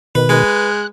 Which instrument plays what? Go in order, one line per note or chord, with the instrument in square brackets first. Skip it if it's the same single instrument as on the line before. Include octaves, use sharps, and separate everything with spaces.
[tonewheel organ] B2 D#3 [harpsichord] B4
[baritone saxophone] G#3 [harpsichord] B4
[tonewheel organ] F#6